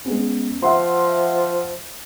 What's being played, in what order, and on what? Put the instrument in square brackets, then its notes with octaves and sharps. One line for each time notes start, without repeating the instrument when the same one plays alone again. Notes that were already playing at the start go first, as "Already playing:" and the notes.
[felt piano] G#3 B3 C#4
[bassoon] F3 [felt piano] E5 F#5 C6